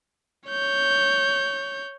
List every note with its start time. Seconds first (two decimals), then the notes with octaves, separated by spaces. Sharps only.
0.48 C#5 G6